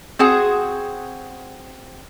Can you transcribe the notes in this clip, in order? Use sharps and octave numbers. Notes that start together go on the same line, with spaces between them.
C4 F#4 G#4 F#5